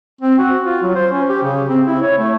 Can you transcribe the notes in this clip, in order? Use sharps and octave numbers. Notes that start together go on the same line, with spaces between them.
C4
F#4
F4
F#3
C5
C#4
G4
C#3
C4
E4
C#5
A3